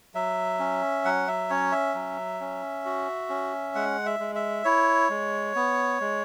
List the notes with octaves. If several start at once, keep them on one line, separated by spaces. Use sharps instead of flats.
F#3 E5
C#4
F#3 F#5
E5
C#4 C#5
E5
F#3
C#4
F#4
C#4
G#3 F#5
E5
G#3
E5
E4 C#5
G#3
B3
G#3